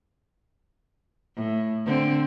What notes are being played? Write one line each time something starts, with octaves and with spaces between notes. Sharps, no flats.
A2
D3 C4